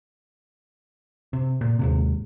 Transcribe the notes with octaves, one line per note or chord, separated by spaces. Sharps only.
C3
A#2
D#2 G#2 C3